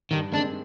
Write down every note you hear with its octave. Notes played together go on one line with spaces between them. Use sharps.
G2 D#3
D#3 G#3 C4 D4